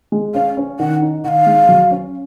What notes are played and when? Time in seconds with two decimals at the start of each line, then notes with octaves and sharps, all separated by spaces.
0.12 G#3
0.34 C#4 F5
0.57 C#4
0.79 D#3 F#5
1.02 D#4
1.24 D#3 F#5
1.28 F5
1.46 G#3
1.69 F#3
1.91 C#4